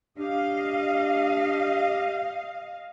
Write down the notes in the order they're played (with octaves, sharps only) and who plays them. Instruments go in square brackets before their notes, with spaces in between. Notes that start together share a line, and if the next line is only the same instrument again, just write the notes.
[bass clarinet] D4 [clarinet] G4 [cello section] D#5 F5